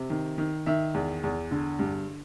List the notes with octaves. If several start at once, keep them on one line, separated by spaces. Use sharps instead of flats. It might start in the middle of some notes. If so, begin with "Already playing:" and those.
Already playing: C3
D#3
D#3
D#3 E5
E2
E2
D3
G2